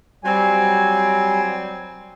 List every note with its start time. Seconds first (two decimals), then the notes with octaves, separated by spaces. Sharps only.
0.24 F#3 G3 C4 G#5